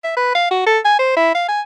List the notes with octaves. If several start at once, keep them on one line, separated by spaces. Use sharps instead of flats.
E5
B4
F5
F#4
A4
G#5
C5
E4
F5
G#5